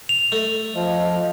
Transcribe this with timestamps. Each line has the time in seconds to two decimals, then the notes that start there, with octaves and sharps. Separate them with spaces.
0.09 F7
0.32 A3
0.75 F3 D#5